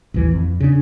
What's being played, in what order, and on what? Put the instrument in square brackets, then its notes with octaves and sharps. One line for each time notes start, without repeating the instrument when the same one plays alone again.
[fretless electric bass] A1 D#2 E3
F2
C#3 D4